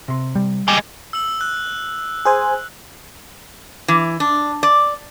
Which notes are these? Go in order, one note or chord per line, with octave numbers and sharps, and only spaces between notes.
C3 C6
G3
G#3 G4 G#5
E6 F#7
F#6
G#4 C5 G#5
E3
D4
D5